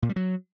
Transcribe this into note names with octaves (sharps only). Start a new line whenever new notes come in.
A#2
G3
F#3